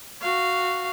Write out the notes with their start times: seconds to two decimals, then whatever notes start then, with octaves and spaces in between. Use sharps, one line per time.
0.22 F#4 F5